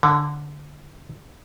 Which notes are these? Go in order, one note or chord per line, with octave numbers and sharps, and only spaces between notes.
D3